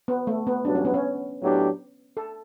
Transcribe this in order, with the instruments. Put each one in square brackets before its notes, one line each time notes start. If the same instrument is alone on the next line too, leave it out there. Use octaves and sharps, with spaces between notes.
[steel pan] B3
A3
B3
[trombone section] A1 G2 F#3 [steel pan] D4
[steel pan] C#4
B3
C#4
[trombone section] A2 F#3 B3 D4 G4
[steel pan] A4